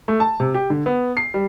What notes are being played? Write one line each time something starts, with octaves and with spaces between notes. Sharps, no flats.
A3
A5
C3
G4
D3
B3
C7
G3